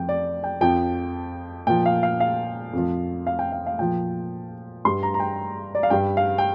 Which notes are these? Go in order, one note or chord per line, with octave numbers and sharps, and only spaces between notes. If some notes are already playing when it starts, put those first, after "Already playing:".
Already playing: F2 F3 G5
D5
G5
F2 F3 G5
A#2 F3 G5
F5
F5
F5
F2 F3
F5
G5
F5
F5
A#2 F3 G5
G2 G3 C6
A#5
A#5
G5
D5
F5
G2 G3 G5
F5
G5